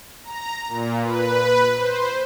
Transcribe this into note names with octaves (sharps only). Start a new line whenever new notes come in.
A#5
A#2
B4
C5